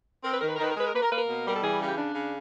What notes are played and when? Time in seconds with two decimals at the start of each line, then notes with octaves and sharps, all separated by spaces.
0.24 C4 A#4
0.33 B4
0.41 D#3 A#4
0.48 B4
0.56 A#4
0.59 D#3 B4
0.71 A#4
0.76 G#3 B4
0.86 A#4
0.94 A#3 B4
1.02 A#4
1.11 A#3 B4
1.18 A#4
1.29 B2
1.45 G3 A#4
1.56 A4
1.63 E3 G#4
1.81 C#3
1.86 G4
1.97 D4
2.15 C#3